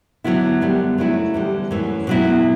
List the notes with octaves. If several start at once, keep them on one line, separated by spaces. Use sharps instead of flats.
D3 F#3 B3 E4
F#2 D3 G3 B3
C#3 F#3 A3 C#4 E4
E2 D3 G3
F#2 E3 A3 C#4
B2 F#3 B3 E4